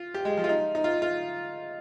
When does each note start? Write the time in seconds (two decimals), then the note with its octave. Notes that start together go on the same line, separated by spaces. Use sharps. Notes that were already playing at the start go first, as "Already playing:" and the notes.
Already playing: F4
0.14 G4
0.25 G#3
0.37 F3
0.44 F4
0.49 D#4
0.75 D#4
0.84 F4
1.02 F4